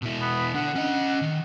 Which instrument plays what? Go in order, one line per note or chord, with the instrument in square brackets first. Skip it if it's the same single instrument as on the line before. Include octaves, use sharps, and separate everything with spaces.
[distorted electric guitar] B2 E4
[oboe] B3
[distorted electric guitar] D3 [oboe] F#5
[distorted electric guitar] C#4 D#5
D#3